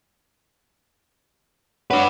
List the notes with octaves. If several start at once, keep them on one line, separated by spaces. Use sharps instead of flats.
F#3 D4 B4